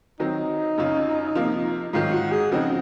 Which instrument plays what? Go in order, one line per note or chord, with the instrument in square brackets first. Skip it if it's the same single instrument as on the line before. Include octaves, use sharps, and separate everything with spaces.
[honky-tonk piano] D#3 F#3 C4 [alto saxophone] D#4
[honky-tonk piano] F#2 C#3 F#3 C#4 F4
C3 F3 A#3 F4
[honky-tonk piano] G#2 D#3 F#3 [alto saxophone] F4
[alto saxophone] F#4
G#4
[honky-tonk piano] C#3 F3 C4 D#4 [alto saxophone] F#4